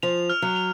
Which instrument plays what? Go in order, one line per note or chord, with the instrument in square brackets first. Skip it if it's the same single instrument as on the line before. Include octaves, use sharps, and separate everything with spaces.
[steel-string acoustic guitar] F3 [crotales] F7
[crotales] F6
[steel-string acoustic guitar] F#3
[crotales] F7